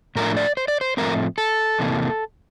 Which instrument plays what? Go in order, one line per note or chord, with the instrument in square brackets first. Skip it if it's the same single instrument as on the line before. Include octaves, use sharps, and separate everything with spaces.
[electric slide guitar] A2 F3 A3 D4 A#4
D5
C5
D5
C5
A2 F3 A3 C4 A#4
A4
E2 C3 E3 A#3